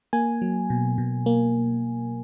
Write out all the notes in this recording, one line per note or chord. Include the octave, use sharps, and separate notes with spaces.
A#3 G#5
F#3
B2
B2
A#3